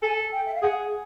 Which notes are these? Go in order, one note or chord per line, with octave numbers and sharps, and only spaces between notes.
A4 G#5
G5
E5
F5
G#4 F#5